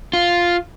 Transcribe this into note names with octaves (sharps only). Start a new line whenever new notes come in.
F4